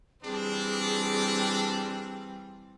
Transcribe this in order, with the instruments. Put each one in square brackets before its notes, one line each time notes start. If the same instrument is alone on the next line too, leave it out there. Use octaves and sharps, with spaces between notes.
[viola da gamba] E3 G3 C4 [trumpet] D4 [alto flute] G#4